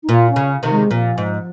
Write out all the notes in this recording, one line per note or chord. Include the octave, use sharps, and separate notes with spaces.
D#4
A#2 F4
C#4
C#3
C3 D#3
G#3
A#2 F3
G#2